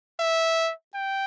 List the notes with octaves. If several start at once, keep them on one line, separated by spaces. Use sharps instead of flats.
E5
G5